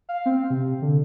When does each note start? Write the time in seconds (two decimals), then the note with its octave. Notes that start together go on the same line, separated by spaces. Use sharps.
0.09 F5
0.26 C4
0.50 C3
0.82 D3